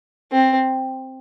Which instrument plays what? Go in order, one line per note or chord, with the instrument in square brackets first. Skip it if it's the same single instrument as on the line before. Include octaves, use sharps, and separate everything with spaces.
[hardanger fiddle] C4